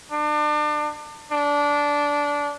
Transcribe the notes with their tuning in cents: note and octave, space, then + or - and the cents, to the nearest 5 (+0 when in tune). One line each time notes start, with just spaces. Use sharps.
D4 +35
D4 -15